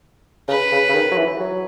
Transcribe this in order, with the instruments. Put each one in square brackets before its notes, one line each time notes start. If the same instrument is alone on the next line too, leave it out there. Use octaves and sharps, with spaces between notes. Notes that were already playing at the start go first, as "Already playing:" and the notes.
[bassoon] C#3 [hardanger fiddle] B4
[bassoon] C#3
C#3
D#3
F#3
E3
F#3